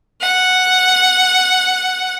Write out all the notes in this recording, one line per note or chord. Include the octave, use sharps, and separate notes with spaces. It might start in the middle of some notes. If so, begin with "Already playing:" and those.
F#5